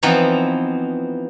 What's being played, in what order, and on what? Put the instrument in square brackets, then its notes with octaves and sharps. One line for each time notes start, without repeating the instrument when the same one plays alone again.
[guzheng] E3 F3 B3 C4 D#4